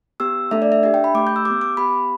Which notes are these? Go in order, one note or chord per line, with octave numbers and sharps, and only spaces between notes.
B3 G4 E6
A3 D4 A4 E5
D5
E5
D4 G4 E5
G5
B5
A3 G4 D6
G6
E6
B3 G4 D6
D6
B3 G4 B5